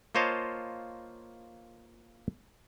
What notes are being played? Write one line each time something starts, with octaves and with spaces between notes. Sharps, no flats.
A#3 F4 C5 C#5 D#5 A5